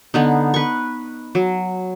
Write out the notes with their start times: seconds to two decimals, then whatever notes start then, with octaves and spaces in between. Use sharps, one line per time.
0.14 D3 B3 D#4
0.54 B4 C#6
1.35 F#3